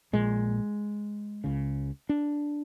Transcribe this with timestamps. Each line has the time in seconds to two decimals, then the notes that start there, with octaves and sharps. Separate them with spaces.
0.13 A#1 A#2 G#3
1.44 C#2 C#3
2.09 D4